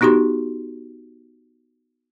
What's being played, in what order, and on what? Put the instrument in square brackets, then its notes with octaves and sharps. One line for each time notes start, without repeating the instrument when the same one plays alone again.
[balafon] B3 D#4 F#4 G4 C6